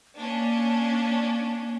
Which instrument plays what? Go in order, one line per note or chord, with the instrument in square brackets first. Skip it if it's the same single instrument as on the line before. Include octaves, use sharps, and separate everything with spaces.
[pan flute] A#3 [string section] C#4 D4